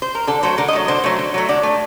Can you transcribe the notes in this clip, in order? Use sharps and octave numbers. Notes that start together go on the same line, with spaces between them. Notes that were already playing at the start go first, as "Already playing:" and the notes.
C5
A#4
D3 A4
F#3 A3 C5
D3 A#4
D#5
F#3 A3
D3 C5
F#3 A3
D3
F#3 A3
D3 D5
A3